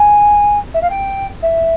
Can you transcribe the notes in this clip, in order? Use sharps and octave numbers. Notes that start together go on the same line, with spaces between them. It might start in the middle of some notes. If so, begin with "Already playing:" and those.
Already playing: G#5
E5
F5
G5
E5